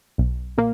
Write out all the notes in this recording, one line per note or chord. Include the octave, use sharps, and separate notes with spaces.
B1
A#2 A#3